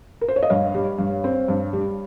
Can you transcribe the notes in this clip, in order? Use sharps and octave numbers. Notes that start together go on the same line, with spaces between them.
A#4
C5
C#5
D#5
G2 C#5 F5
G3
G2
C4
G2
G3